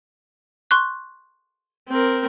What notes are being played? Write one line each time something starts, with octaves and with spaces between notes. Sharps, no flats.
C6 C#6 F#6
C4 A#4